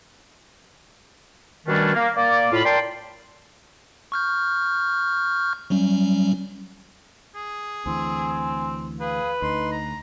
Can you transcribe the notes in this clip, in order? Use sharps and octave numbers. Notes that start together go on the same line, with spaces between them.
B2 D#3 G3 A3 C#4 D4
A#3
A#3 D5
A2 F4 B5
A#4 D5 G5 A5 C6
C#6 F6 G6
F#3 G3 C#4
G#4
D2 E3 C4 G#5
G#4 B4 F5
D2 D#4 C6
A#5